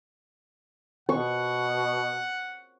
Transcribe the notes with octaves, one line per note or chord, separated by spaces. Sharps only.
B2 F#5 C#6